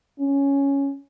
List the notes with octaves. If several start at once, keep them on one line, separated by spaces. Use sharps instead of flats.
C#4